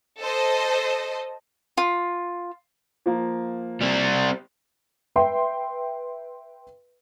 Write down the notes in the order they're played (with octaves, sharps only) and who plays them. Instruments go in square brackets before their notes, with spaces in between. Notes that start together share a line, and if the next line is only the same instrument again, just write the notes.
[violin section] A4 C5 D#5
[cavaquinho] F4
[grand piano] F3 A#3
[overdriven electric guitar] G3 C4
[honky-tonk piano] B4 E5 G5 C6